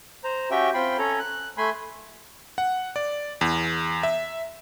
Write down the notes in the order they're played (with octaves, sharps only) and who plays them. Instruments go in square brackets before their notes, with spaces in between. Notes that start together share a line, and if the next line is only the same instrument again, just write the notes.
[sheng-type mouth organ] C5 A#5
C#4 F#4 G4 E5 G5
C4 F4 G5 B5 C6
C#4 A4 C#5 A#5
F#6
A3 G#5 B5 C6
[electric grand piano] F#5
D5
E2
E5